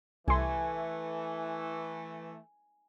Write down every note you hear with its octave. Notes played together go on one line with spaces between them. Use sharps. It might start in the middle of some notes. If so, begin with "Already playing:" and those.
C2 E3 A3 G#5 C6